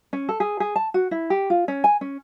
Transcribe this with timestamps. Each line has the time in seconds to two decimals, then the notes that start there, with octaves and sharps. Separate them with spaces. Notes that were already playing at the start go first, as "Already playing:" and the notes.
0.13 C#4
0.29 A4
0.40 G#4
0.60 G#4
0.76 A5
0.94 F#4
1.11 E4
1.30 G4
1.50 F4
1.68 C#4
1.84 G#5
2.01 C#4